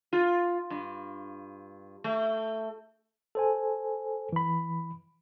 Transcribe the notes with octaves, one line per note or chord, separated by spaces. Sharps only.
F4
G2
A3
A4 C5 G#5
E3 B5